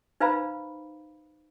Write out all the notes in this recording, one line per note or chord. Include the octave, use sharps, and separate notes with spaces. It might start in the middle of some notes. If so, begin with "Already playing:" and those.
D#4 B4 C5 F5 A#5 B5